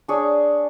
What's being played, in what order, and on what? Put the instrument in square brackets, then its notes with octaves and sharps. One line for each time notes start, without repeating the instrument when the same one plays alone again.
[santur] D4 G#4 C#5